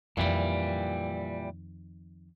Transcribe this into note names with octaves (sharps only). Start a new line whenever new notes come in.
F2 A#2 D#3 E3 G3